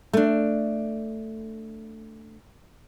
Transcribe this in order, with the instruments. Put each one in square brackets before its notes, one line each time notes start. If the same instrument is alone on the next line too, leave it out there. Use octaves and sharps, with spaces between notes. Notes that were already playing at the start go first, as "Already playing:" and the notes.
[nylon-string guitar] A3 D4